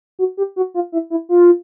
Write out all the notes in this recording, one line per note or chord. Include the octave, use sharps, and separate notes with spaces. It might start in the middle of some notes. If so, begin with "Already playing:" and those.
F#4
G4
F#4
F4
E4
E4
F4